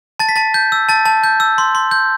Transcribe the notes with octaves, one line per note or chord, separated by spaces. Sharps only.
A5 A6
B6
A5 A6
G6
E6
A5 A6
A5
G6
E6
C6
C6
G6